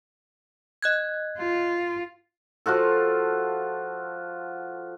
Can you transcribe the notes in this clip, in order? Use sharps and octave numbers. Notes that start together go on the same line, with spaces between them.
D#5 F#6 G#6
F4
F3 F4 F#4 A4